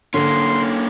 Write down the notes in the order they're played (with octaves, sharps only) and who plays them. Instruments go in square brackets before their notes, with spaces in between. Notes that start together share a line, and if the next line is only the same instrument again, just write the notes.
[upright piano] D3 [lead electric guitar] A#3 C#4 [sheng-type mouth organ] C6